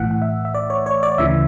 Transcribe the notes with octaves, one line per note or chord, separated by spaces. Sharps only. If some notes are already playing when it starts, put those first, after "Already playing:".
Already playing: B1 A2 E3 F#5
F#5
E5
E5
D5
C#5
C#5
D5
D2 C#3 E3 E5